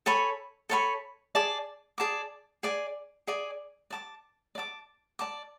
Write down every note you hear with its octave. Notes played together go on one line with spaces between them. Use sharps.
A4 C#5 G#5 B5
A4 C#5 G#5 B5
G#4 D5 A5 D6
G#4 D5 A5 D6
G#4 D5 G#5
G#4 D5 G#5
D5 A5 D6
D5
A5 D6
D5 A5 D6